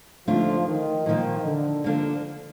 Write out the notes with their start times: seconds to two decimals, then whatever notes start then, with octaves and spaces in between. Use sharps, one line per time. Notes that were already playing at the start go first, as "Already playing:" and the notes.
0.27 D#2 D3 F3 A3 D4 F4
0.66 D#3
1.06 A#2 D#3 F3 A#3
1.45 D3
1.84 D3 F3 A#3 D4 A4